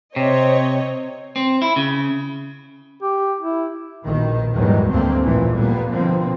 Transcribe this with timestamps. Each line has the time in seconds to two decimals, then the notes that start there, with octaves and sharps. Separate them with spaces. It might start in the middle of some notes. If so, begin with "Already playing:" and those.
0.16 C3 C4 C#5 D#5
1.36 C4
1.62 E4
1.76 C#3
3.02 G4
3.40 E4
4.04 A#1 B2 D#3
4.54 E2 G#2 D#3 F#3 G3
4.90 D2 G2 A3 A#3 C4
5.23 A1 F2 A#2 E3 F3 A3
5.56 A#2 G3 A#3 B3
5.90 B2 D3 F3 A#3 C4